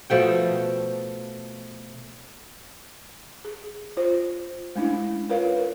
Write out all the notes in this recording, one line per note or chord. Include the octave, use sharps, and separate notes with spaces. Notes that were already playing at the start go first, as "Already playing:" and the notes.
B2 F3 A3 G5
G#4
F4 C5
G#3 A3 C#4 D4 E4
F4 A#4 B4 C#5 F5
A#4